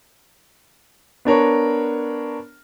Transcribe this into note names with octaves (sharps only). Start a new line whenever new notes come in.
B3 D4 A#4 C#5